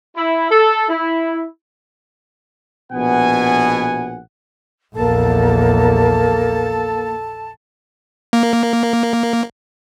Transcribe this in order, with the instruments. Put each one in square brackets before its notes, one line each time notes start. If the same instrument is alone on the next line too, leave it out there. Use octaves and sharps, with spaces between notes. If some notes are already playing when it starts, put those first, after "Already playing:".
[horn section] E4
A4
E4
[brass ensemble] A#1 B2 B3 F#5 G#5
[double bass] A#1 E2 [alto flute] A#3 [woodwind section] A4 A5
[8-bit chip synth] A#3